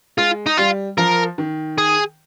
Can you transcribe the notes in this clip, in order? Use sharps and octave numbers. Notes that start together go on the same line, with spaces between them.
G#3 F4
D#4
G3 F4
F3 A#4
D#3
G#4